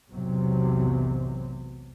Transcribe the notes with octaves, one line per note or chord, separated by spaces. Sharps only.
B1 E2 G#2 C3 F#3